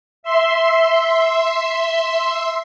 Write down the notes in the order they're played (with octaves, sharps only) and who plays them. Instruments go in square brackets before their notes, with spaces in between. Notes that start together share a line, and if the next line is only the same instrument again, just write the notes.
[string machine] E5 C6